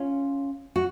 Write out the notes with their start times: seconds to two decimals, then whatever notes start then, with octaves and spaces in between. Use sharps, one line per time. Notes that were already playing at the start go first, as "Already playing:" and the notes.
Already playing: C#4 F4
0.76 F#4